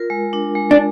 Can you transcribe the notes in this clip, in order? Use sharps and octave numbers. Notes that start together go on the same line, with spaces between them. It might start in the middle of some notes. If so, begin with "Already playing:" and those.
Already playing: F4 A#4
G#3
D4
G#3
D4